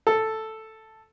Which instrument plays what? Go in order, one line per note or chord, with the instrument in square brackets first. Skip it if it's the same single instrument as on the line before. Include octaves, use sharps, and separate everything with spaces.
[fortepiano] A4